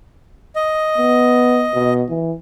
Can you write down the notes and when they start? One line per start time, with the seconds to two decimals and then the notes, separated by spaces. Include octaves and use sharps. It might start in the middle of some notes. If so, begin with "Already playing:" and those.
0.55 D#5
0.98 B3
1.74 B2
2.09 E3